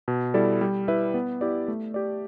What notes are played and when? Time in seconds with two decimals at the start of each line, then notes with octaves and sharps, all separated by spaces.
0.08 B2
0.34 G3 E4 A4 D5
0.61 G3
0.88 E4 B4 E5
1.14 B3
1.41 E4 G4 D5
1.68 A3
1.94 G4 D5